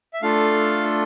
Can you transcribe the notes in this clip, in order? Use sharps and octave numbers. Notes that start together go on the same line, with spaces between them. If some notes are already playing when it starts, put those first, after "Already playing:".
E5
A3 D4 F4 A4 F5